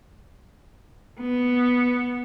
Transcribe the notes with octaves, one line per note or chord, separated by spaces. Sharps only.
B3